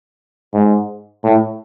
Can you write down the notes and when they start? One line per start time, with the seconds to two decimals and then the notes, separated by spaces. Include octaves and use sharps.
0.54 G#2
1.24 A2